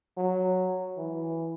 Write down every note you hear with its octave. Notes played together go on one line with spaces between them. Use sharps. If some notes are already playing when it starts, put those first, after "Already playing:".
F#3
E3